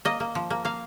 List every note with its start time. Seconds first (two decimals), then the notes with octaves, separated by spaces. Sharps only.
0.05 A#3 D#5
0.20 A#3
0.35 F3
0.50 A#3
0.65 A#3 F5